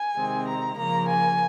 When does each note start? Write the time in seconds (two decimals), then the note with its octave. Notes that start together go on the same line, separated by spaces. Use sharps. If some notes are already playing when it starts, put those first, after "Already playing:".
Already playing: G#5
0.16 C3 D#3 G#3 C4
0.47 A#5
0.77 C#3 F3 A#3 A#5
1.08 G#5